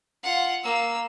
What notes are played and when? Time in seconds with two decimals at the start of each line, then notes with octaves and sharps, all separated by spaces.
0.24 F4 F#5
0.64 A#3 E6